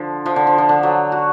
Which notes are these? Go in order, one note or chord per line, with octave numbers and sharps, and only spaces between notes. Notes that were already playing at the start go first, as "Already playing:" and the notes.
Already playing: D3 F3
F3
D3
F3
F3
D3
F#3
F#4